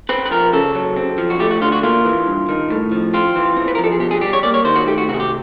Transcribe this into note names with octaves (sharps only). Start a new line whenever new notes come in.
C4 B4
B4
F3 A#4
C#3 A4
F#3
C4
F3
F#4
A3 G4
F#4
D3 F4
F#4
A#3 F4
E3
G2
D#3
A2
F3
C4 F4
E3
C4
B4
A#4
F3
A4
G#4
B2 G4
G#4
G3 G4
C#5
A#3 D5
C#5
D#3 C5
F#4
A3 G4
F#4
C3 F#4
G#4
G4